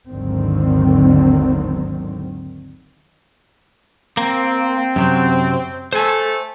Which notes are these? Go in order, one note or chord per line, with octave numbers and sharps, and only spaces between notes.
G#1 D#2 D3 D#3 F#3 C4
A#3 C4
F#2 C3 F#3
A3 A4 C5 G#5